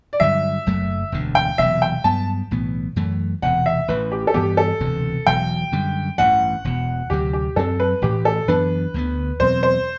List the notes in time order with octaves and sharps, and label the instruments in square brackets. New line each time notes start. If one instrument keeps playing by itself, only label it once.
[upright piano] D5
[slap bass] G2 D3 F#3 [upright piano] E5
[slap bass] F#1 F#2 F#3 A3
E1 D2 D3
[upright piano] G5
[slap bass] E1 E2 C3 F#3 [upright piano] E5
[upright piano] G5
[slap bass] G2 F#3 B3 [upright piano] A5
[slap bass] B1 A2 E3 B3
F#2 E3 A3
[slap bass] E1 E2 C3 [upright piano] F#5
[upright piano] E5
[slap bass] A1 A2 E3 [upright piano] B4
[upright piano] G4
A4
[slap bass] G2 E3 B3 [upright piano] G4
[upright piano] A4
[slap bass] E1 D2 C3 E3
[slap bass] E1 E2 B2 F#3 [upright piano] G5
[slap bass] F#2 D3 G3
[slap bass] A1 G2 E3 [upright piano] F#5
[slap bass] E1 E2 B2
[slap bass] D2 C3 F#3 [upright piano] G4
[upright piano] G4
[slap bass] F#2 F#3 C4 [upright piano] A4
[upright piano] B4
[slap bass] A1 A2 E3 [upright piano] G4
[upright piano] A4
[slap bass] F#2 E3 B3 D4 [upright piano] B4
[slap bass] D2 D3 F#3 B3
[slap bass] E2 B2 F#3 C4 [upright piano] C5
[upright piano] C5